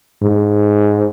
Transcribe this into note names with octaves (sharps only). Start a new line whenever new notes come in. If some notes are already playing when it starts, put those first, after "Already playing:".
G#2